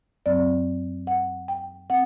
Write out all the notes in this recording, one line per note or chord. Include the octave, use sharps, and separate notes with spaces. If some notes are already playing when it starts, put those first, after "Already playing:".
F#2 F#3 C4 D5
F#5
G5
C4 F#5